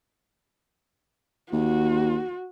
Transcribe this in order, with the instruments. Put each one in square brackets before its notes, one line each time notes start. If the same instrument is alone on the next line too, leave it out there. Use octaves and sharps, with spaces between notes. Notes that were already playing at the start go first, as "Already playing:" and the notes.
[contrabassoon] D#2 [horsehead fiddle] F#4